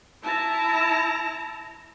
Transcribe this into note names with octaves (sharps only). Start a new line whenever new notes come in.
E4 A5 A#5